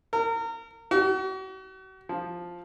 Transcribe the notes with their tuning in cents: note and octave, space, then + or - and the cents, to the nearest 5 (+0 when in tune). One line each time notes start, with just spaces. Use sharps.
A#4 -30
F#4 +40
F3 +5